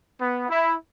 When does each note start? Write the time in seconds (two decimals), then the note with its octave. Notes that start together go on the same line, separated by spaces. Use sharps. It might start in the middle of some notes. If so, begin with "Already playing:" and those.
0.21 B3
0.49 E4